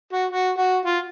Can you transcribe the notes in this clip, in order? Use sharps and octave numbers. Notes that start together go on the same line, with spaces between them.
F#4
F#4
F#4
F4